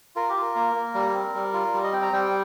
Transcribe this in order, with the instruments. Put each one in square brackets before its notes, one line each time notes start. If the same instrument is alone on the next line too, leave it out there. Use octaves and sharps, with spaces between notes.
[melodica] F4 A#4
G4
F4
A#4
A#3
A#3
G3
C4
G3
F4
G3
D#5
C4 G5
A#5
G3 G5